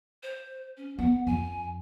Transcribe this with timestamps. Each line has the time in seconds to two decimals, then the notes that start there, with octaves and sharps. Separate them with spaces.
0.23 C5
0.77 C#4
0.99 B3 F#5
1.27 F2 G#5